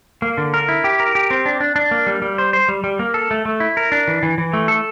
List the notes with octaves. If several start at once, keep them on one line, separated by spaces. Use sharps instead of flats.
A#3
D3
A#4
E4
G4
A#4
G4
C4
D4
D4
D4
A#3
G3
G3
C5
C5
G3
G3
A#3
A4
A3
A3
E4
A#4
D4
E3
E3
E3
A3
A4